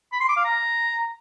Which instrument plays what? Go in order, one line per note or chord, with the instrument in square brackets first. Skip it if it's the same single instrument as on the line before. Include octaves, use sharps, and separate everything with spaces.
[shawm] B5
C6
D6
F5
A#5